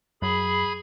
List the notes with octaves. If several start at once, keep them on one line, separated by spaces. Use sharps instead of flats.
F#2 G#4 B5